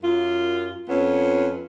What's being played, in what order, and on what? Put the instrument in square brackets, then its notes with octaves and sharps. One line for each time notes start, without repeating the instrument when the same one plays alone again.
[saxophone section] F#2 F4
F2 B3 C#4 F4